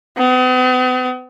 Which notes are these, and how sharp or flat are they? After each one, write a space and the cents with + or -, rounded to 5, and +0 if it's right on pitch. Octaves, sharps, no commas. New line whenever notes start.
B3 +45